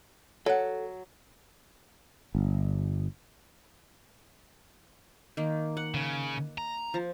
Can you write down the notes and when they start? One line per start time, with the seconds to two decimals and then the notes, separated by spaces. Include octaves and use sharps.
0.46 F#3 A4 F#5
2.35 G1
5.37 D#3 A#3
5.77 F#5
5.94 C#3
6.58 A#5
6.94 F3